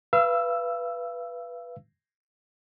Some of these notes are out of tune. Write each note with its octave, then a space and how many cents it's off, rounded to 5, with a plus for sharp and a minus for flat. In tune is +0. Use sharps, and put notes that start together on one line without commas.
B4 -5 F5 -40 E6 +0